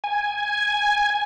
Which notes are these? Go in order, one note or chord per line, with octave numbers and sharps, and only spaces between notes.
G#5